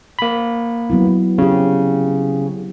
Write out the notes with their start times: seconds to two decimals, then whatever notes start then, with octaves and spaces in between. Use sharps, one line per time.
0.19 A#3 B5
0.90 F#3 B3 E4
1.07 B3
1.38 C#3 C4 G4